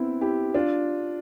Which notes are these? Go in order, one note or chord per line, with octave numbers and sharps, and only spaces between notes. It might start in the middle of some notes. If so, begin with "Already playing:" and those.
Already playing: B3 C4 E4
E4 G4
D4 F4